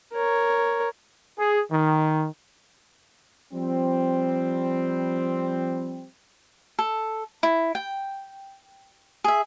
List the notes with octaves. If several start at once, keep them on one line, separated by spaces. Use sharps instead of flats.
A#4 C#5
G#4
D#3
F3 G3 C4
A4
E4
G5
G#4 E5